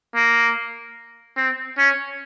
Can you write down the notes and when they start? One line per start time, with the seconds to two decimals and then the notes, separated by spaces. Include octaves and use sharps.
0.15 A#3
1.37 C4
1.78 C#4